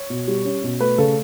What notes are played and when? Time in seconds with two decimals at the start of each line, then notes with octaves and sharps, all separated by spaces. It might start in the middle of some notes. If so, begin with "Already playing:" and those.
Already playing: C#5
0.10 B2
0.28 G3
0.45 C#4
0.64 B2
0.80 A3 B4
0.98 C#3 A4